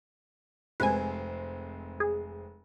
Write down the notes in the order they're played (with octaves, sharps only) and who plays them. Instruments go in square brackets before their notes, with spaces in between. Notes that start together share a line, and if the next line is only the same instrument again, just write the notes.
[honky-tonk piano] F1 G#3 C4 [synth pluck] B4 G#5
[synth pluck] G#4